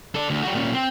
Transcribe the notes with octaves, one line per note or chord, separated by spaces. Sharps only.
A4 D5
D2
G3 F#4
A#2 C#4
C4